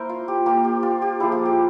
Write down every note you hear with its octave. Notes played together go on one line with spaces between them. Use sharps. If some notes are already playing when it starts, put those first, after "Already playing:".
Already playing: A#3 E4 A#4 C5
F4
G4
A#3 F4 G4
G4
F4
G4
F3 A#3 E4 G#4
F4
G4